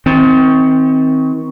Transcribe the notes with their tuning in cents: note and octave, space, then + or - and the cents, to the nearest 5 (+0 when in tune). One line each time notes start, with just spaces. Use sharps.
D#3 +35 C4 +0